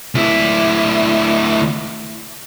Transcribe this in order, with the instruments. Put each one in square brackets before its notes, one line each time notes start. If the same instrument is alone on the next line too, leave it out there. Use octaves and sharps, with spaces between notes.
[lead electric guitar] D2 E4